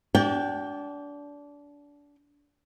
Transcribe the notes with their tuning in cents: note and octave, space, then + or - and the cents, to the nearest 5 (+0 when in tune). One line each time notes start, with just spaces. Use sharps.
D4 -25 F#4 +45 G5 +20